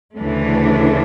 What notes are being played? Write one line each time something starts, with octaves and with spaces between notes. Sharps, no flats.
D2 C#3 E3 A3 D4